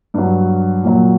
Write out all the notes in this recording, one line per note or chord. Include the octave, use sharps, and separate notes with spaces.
G2 F#3
A#2 F#3